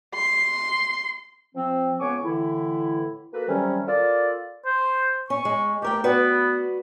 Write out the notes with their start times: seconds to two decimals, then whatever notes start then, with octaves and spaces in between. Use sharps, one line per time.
0.15 C6
1.55 F3 C4
2.00 C#2 B3 C#5 G#5 C#6 D6
2.23 A2 D3 E3 E4
3.33 A#3 F#4 A4 B4
3.48 C3 D#3 F#3 G3 C#4
3.87 F4 A4 A#4 D5
4.66 C5
5.30 C#4 C#6
5.45 G#3
5.82 A3 G4 A#4 G5
6.04 B3 F#4 B4 D5